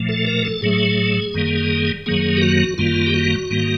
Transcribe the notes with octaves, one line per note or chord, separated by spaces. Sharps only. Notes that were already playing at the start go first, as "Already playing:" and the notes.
Already playing: A#2 F3 A3
A4
A#4
A4
A2 F#3 A3 G#4
F#2 D#3 G3 A#3
F#2 D#3 F#3 A#3 G#4
G4
F#4
F#2 D#3 G3 A#3 F4
G4
F#4
G#2 D#3 G3 A#3